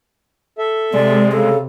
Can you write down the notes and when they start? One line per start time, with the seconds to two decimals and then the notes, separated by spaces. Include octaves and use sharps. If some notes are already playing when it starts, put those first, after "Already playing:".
0.58 A4 E5
0.94 C3 G#3 D5
1.32 C#3 A4